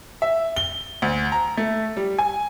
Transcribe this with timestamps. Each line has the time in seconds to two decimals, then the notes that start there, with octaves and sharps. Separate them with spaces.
0.22 E5
0.56 G7
1.02 D2
1.32 A#5
1.57 A3
1.97 G3
2.19 G#5